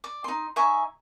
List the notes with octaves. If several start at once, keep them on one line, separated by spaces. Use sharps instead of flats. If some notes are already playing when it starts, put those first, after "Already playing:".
D5
D#4 C6
D#4 E5 G#5 C#6